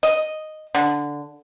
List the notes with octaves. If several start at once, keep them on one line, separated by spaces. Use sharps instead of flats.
D#5
D3